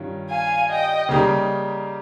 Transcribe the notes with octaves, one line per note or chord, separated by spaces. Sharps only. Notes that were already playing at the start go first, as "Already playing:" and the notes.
Already playing: G2 D#3 C#4 F4
F5 G#5
D#5 G5
C#3 G3 A#3 D#4 G4